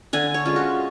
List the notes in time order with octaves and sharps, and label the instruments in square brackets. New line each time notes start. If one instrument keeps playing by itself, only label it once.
[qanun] D3 G#5
C#5
G#3 C#4 F4
F#4